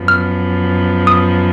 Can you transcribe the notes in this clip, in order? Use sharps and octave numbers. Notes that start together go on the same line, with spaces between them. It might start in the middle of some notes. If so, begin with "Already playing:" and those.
Already playing: F#2 F3 B3
F6
D#6